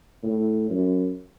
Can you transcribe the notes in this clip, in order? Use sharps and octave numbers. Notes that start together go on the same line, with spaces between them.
A2
F#2